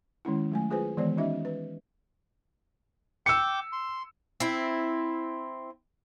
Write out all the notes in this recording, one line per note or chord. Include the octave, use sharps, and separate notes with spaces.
D#3 G#3 C#4 E4
F#3 A3 G#5
F4 G#4 B4 C5 G#5
D#3 E3 G#3 B3 C5 D5
C#4 D#4 F#4 D#5 E5
B4
G5 D6 E6 C#7
C6
C4 E4